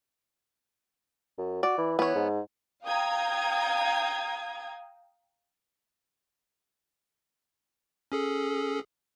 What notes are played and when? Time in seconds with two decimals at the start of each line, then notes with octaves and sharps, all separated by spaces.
1.38 F#2
1.63 F#4 D5
1.78 E3
1.99 E3 B3 C#5
2.15 G#2
2.86 F5 G5 A#5 D#6 G#6
8.12 C#4 G#4 A4